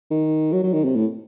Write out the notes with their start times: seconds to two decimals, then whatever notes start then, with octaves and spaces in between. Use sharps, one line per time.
0.11 D#3
0.53 F#3
0.63 F#3
0.73 D#3
0.84 C3
0.95 A2